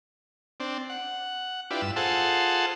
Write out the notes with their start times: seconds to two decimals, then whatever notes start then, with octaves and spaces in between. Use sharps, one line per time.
0.60 C4 D4
0.90 F#5
1.71 D4 E4 F4 G4 B4
1.82 G2 E6
1.96 F4 G#4 A4 C5 F#5 A5